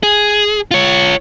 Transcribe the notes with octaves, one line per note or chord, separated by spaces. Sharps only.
G#4
F4 C#5